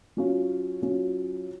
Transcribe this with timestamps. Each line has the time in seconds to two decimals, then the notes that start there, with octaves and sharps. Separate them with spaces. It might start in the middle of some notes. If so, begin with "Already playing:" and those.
0.17 F#3 C#4 F4
0.82 F#3 C#4 F4